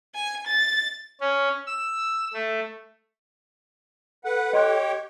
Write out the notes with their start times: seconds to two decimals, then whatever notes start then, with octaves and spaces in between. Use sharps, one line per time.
0.15 G#5
0.47 A6
1.20 C#4
1.67 E6
2.34 A3
4.25 A4 B4 F#5
4.53 G4 C#5 D#5 G5 C6 F#6